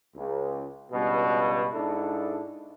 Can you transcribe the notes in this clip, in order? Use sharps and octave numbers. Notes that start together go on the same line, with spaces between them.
C#2
C#2 G2 B2
G#2 D4 E4 A4